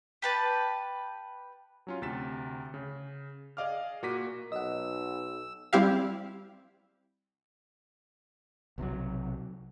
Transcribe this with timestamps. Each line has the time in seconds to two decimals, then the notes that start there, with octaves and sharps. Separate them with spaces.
0.22 G4 B4 A5
1.87 F#3 C#4 F4
2.02 D2 C3 A6 B6 E7
2.74 C#3
3.57 G#4 D5 D#5 F5 D6 F6
4.02 A#2 A#3 F#4 D6 B6 D#7
4.52 B1 D#5 F#5 E6
5.73 G3 C4 E4 G4 E5 F5
8.78 B1 C3 F3 F#3